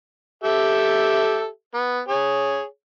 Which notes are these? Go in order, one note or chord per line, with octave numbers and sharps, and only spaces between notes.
G4 A4 E5
B3
G#4 C#5